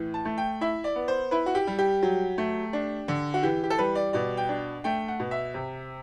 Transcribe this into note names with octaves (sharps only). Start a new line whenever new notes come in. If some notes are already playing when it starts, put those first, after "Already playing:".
Already playing: A2 E3
A5
A3
G5
E4 E5
D5
B3
C5
E4 B4
F#4
G4
G3
G4
F#3
A3
D4
D3
F#4
E3 G4
G4
A4
G3 B4
D5
B2 D5
G5
D4
A3 G5
F#5
B2
E5
C3